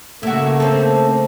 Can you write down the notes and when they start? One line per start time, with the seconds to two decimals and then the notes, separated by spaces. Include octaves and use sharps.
0.23 C#3 A3 A#3 E4 F#4
0.60 C4 A4